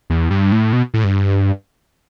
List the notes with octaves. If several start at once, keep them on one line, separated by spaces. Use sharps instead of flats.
E2
G2
A2
B2
A2
G2